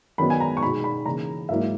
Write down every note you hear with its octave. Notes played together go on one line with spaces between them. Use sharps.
F#2 D#3 F#3 B3 D#4 B5
G#5
A#5
C#6
B2 G#3 D#4 B5
B5
C#3 E3 A#3 D#4 A#5
G#2 F#3 A#3 E4 E5